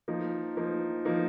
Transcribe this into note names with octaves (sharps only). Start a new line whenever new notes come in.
F3 A#3 D#4
F3 A#3 D#4
F3 A#3 D#4